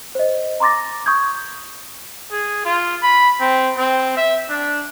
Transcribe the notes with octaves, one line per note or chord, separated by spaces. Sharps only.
C5 D#5
A#5 C6 D6 A6 A#6
C#6 D#6 G6 G#6
G#4
F4
B5
C4
C4
E5
D4